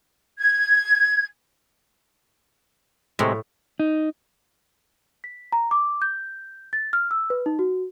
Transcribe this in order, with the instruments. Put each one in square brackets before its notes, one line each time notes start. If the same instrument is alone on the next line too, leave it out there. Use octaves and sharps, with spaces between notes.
[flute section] G#6
[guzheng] A2 [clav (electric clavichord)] C3 G#3
[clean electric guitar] D#4
[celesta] B6
A#5
D6
G6
A6
F6
E6
B4
D#4
F#4